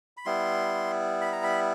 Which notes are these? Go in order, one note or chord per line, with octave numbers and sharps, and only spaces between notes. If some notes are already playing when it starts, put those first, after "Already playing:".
B5
G3 B3 E4 C6
B5
A#5
B5